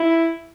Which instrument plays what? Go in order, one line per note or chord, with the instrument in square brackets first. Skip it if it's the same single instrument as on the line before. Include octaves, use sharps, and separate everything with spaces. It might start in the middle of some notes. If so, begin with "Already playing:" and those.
Already playing: [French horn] E4